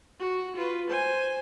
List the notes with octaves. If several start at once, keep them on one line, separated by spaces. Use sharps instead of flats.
F#4
F4 B4
C5 G#5